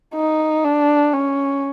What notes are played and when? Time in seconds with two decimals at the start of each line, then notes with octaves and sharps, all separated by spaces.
0.15 D#4
0.64 D4
1.13 C#4